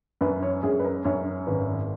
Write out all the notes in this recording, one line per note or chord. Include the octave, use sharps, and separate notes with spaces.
F#2 B4
C#5
F#2 G#4
B4
A#4
F#2 C#5
G#1 B4